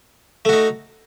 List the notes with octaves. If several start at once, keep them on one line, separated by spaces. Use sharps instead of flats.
A3 D#4 F#4